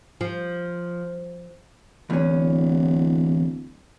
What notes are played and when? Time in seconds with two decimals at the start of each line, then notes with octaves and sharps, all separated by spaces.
0.21 F3
2.10 D1 E2 C#4